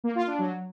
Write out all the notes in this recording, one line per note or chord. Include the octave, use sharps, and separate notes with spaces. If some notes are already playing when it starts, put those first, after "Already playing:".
A#3
F4
D4
F#3